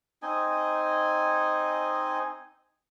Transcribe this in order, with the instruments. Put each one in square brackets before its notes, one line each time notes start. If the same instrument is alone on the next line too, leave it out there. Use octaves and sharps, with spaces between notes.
[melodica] C4 D#4 D#5 G#5